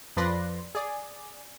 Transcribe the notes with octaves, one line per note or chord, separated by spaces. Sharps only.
F2 F3 B4 D5 C6 A#6
G#4 D5